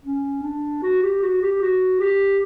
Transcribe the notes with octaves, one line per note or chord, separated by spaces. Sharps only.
C#4
D4
F#4
G4
F#4
G4
F#4
G4